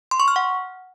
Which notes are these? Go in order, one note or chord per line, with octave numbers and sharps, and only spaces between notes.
C6
C#6
F6
F#5